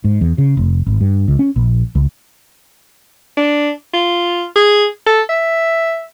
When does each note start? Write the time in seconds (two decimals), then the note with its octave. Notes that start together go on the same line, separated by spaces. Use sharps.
0.04 G#2
0.21 E2
0.38 C#3
0.57 F1
0.86 G#1
1.01 G2
1.28 C#2
1.39 C#4
1.56 A#1
1.95 C#2
3.37 D4
3.94 F4
4.56 G#4
5.06 A4
5.29 E5